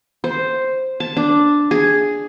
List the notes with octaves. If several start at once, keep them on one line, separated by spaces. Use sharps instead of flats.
C5
A5
D4
G#4